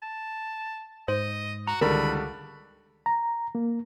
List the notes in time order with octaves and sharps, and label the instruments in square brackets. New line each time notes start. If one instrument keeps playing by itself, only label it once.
[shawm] A5
[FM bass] G#2 [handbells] C5 [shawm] D#5
[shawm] F#4 [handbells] A#5
[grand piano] C#2 D3 G3 [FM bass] D#3 [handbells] A#4 [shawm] B5
[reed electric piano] A#5
A#3